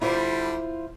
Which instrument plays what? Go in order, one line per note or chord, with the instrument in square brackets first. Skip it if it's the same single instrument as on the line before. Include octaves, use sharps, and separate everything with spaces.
[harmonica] D3 G3 B5 [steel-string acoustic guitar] E4 F4 C5